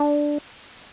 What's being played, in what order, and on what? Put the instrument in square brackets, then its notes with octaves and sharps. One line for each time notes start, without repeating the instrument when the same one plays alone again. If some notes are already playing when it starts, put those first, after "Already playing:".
Already playing: [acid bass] D4